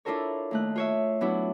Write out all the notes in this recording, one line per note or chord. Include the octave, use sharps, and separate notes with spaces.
D4 E4 F4 A4 A#4 C#5
D#2 A3 F#6
F4 C#5 E5
F#3 B3 D4 E4